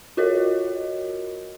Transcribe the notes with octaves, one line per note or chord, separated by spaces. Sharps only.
F4 F#4 A#4 C#5 D#5